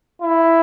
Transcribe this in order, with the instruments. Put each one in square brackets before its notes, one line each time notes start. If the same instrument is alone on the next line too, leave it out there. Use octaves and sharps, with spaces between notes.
[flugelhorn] E4